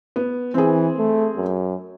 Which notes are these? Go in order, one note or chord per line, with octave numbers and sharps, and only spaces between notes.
B3
E3 C4 G#4
A3
F#2